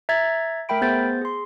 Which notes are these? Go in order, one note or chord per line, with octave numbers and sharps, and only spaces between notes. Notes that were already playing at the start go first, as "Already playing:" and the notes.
E5 A#5 G#6 A6
A3 A#4 E5 G5 B5 D7
B3 G#4 C5 G6 A6
G#4 C6